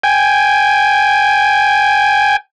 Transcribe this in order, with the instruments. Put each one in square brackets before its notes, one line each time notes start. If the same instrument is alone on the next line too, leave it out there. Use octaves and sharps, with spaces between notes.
[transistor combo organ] G5 G#5